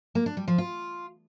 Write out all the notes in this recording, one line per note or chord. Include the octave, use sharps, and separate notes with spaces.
A#3
D4
G3
F3
F4